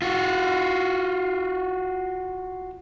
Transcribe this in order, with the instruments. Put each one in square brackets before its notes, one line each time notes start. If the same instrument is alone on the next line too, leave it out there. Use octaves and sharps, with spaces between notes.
[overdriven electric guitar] F4 F#4